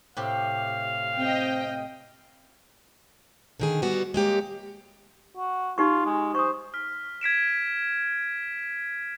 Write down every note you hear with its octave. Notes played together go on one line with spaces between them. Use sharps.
A2 C3 G4 F5
C4 D#5 G5
D3 D#3 G#4
G3 B3 F#4
G#3 A#3 G4 C#5
F#4
D#4 F4 G4 C#6
G#3
C5 C#6 D#6
F6 B6
G#6 B6 D7 E7